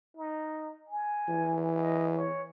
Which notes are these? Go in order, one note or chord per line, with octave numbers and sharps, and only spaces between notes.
D#4
G#5
E3
D#5
C#5